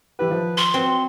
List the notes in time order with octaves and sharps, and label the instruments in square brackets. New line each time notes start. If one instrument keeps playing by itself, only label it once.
[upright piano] E3 E4 G4 [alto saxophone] B4
[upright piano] D#3 F3
[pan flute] C6
[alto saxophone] F#3 [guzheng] C4